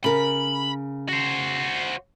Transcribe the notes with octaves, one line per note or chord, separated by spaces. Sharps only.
C#3 A#4 B5
F#4 C5